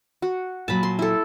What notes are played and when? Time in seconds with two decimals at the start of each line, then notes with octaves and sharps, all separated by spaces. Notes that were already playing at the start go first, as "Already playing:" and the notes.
0.22 F#4
0.68 A#2 F#3 A5 B5
0.83 C6
0.99 E4 A4